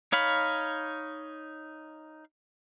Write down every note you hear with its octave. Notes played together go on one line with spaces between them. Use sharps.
D#4 C#5 F5 B5